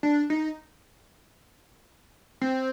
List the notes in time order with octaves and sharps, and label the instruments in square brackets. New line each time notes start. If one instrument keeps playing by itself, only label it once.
[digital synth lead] D4
D#4
C4